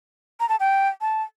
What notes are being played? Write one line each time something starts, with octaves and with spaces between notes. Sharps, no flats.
A#5
A5
G5
A5